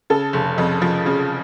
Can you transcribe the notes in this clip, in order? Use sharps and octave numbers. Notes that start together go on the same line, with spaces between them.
C#3 A4
F1
F2
F3
C#3